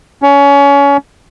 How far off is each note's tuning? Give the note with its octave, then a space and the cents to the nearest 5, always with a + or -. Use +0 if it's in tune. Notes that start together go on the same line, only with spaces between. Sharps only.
C#4 +25